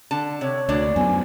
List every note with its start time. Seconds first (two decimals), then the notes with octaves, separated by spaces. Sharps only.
0.11 D3 A5
0.41 C3 C#5
0.69 D2 A#3 D4 D5
0.96 F#2 A#3 B3 G#5